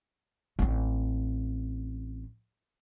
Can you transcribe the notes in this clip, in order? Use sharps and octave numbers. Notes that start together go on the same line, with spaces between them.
A1 C4